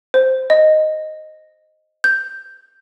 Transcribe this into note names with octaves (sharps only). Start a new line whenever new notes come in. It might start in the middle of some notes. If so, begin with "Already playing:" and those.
C5
D#5
G6